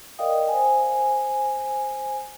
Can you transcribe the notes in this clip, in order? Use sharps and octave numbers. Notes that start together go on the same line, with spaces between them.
A#4 D5 D#5 F5 G5 D#6
C5 G#5